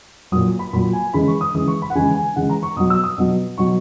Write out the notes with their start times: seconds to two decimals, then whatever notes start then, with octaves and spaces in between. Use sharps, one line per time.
0.32 A#2 F#3 D#6
0.59 B5
0.73 A#2 F#3 B5
0.93 G#5
1.13 C#3 E3 G#3 B5
1.28 C#6
1.41 D#6
1.54 C#3 E3 G#3 D#6
1.68 C#6
1.82 B5
1.90 F#5
1.95 C#3 E3 G#3 G#5
2.15 G#5
2.36 C#3 E3 G#3 F#5
2.49 A#5
2.63 C#6
2.76 B2 F#3 D#6
2.90 E6
3.04 D#6
3.18 B2 F#3
3.58 B2 F#3 C#6